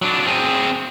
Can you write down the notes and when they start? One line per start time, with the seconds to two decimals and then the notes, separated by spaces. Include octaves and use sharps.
0.02 F#3 D4
0.26 C4 G#4